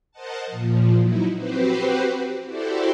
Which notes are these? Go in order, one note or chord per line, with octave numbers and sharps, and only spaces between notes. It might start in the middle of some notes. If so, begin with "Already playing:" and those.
A#4 C5 D#5 F#5 A5
A#2 F3
F#3 D#4 E4
C4 F#4 G4 B4 C5
E4 F#4 G4 A4 C5 D5